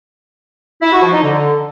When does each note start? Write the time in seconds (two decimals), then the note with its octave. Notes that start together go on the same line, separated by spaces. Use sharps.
0.82 E4
0.92 F#4
1.02 F3
1.13 D#4
1.23 D3